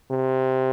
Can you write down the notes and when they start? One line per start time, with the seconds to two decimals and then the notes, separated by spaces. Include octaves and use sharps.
0.11 C3